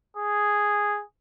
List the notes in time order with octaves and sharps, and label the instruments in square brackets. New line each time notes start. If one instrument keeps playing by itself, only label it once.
[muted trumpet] G#4